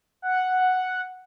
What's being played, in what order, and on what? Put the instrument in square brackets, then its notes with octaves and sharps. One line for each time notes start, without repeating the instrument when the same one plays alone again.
[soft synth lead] F#5